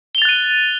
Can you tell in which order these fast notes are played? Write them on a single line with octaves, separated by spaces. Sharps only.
G7 F7 A6 F#6 D#7